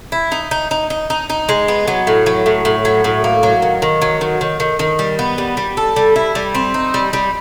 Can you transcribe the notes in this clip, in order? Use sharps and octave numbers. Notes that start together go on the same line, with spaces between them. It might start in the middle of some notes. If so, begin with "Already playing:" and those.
E4
D#4
D#4
D#4
D#4
D#4
D#4
G#3
B3
F#3
A2
F#3
A2
A2
F#3
A2
A#3
F#3
D#3
D#3
F#3
D#3
D#3
D#3
D#3
G3
B3
G3
G3
A4
G3
E4
G3
C4
D#4
G3
G3